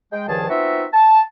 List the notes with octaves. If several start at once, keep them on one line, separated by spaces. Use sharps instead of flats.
G#3 G5
C#2 G2 D#3 F3 G#4 A5
B3 C4 D#4 F4 F#4 E5
A5